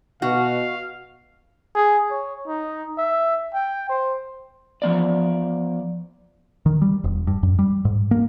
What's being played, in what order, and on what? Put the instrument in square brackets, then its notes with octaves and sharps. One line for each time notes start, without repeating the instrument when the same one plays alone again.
[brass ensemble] B2 [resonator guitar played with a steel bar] F#4 [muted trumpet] F5
[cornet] G#4
C#5
D#4
E5
G5
C5
[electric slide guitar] F3 B3 D5
[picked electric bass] D#3
G3
E1
G2
F#2
G3
G#2
A#3